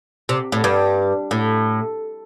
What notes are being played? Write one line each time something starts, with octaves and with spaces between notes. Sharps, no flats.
C3
A2
G2
A2